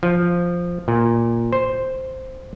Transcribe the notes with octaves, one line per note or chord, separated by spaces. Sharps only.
F3
A#2
C5